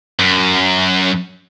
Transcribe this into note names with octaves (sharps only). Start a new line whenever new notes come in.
F#2